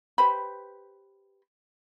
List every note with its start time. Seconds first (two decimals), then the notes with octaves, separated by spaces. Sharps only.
0.18 G4 B4 C5 B5